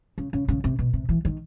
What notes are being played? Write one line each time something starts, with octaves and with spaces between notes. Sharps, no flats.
C#3
C#3
C#3
C3
B2
C3
E3
D#3